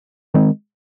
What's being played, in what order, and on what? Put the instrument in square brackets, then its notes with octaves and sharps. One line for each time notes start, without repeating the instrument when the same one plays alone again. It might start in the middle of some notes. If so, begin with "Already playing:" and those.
[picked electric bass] D#3 G#3 C4